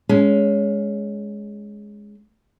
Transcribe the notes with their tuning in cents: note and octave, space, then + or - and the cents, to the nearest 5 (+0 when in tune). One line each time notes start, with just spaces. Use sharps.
G#3 +0 C#4 +15